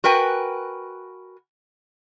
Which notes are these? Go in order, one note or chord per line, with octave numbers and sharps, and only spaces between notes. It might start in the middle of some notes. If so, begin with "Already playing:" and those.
F#4 A#4 B4 G5 G#5